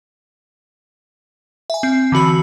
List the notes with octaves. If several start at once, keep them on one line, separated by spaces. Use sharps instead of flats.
E5 G#5
C4
D3 E3 F#4 B5